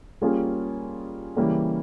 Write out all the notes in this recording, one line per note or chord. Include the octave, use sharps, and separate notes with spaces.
G3 A#3 C#4 F4 G#4
C#3 E3 G3 A#3 C#4